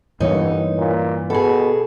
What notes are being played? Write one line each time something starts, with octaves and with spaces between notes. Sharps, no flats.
G1 G2 E3 A#3 D#4 C#5
A#2
B2 G#4 A4